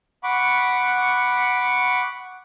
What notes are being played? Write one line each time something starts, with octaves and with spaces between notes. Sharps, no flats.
F#5 B5 C#6 D6